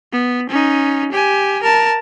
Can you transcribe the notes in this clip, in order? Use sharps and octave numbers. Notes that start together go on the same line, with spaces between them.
B3
C#4 D#4
G4 G#5
A#4 A5